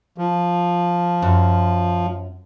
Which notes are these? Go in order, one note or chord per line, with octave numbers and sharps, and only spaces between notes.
F3
F#2